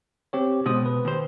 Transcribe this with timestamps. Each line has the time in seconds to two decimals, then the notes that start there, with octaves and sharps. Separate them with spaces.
0.33 C4 G4 C#5
0.66 B2 G#3 C5 D#6
0.86 B4
1.05 D#2 C5